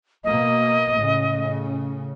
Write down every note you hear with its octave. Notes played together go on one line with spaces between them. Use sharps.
B2 A#3 D#5
A2 C#3